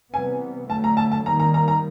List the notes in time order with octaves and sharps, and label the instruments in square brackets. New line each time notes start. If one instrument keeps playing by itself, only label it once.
[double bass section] C3 E3 G3 B3 [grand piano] G#5
[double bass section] D3 F#3 A3 [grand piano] A5
[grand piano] A#5
A5
A5
[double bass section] D#3 G3 A#3 [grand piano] A#5
[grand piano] A#5
A#5
A#5